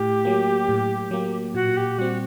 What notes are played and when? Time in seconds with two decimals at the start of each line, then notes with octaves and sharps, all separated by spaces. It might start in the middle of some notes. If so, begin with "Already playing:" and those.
Already playing: A2 G4
0.25 F#3 A#3
0.69 A2
1.11 F#3 A#3
1.54 A#2 F#4
1.77 G4
1.98 G3 C4 F#4